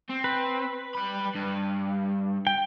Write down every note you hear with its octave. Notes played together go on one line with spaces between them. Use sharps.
C4
B4
G3 B5
G2
G5